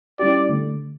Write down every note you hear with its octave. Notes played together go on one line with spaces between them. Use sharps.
G3 C#4 E4 G4 D5
D3 A3